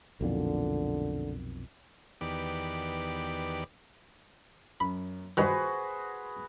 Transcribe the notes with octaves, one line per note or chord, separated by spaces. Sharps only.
B1 F2 A#2 D3
E2 D#3 B3 G4 D5 D6
F#2 B5
G2 D#3 F#4 G#4 B4 C5 B5